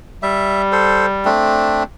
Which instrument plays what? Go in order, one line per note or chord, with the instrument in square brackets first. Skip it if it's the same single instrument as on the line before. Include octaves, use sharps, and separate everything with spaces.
[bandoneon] G3 [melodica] E5
[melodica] A4 C5
A3 C4 D4